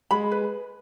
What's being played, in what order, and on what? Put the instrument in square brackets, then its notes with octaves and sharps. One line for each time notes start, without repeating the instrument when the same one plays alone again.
[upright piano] G#3 [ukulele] B5
[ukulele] B4